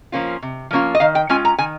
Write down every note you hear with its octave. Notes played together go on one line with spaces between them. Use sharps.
F3 A#3 C#4 F4
C3
F3 A#3 C#4 F4
D#5
D#3 F5
G5
G#3 C#4 F4 G#5
A#5
D#3 G#5